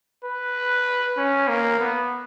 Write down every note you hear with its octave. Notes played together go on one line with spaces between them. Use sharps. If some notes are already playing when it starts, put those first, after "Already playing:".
B4
C#4
A#3
B3